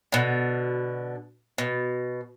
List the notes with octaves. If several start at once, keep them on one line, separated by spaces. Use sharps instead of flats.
B2 D3
B2